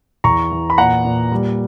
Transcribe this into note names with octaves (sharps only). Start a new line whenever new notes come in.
E2 A#5 C#6
E3
B5
A#2 F#5 A#5
A#2
G3